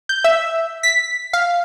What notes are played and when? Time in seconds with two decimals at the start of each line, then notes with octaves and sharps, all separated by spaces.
0.09 G6
0.24 E5
0.83 B6
1.33 F5